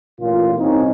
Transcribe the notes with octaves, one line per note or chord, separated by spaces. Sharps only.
A1 A#2 A#3 C#4 F4
C2 C4 C#4 D#4